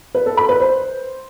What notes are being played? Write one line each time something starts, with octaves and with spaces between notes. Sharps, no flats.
B4
A4
B5
B4
C5